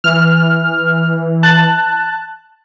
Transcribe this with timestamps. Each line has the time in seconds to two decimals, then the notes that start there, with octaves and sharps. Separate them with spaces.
0.04 E3 F6
1.43 A5 F#6